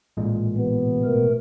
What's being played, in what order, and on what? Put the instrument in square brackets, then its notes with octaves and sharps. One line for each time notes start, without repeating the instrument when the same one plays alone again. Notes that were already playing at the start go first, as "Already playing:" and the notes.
[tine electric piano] A1 A#2 G#3
[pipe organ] C3 E3 [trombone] B3
[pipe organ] B2 A3 A#4